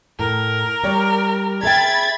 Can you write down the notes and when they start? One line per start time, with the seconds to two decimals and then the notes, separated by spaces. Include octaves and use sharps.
0.19 A2 A#4
0.84 G3 C#5 D5
1.63 G#4 E5 G5 B5 G#6 A6